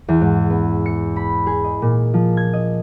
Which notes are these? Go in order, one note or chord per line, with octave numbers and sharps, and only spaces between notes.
E2
G#2
B3
C#7
B5
G#4
D#5
A#2
F3
G#6
D#5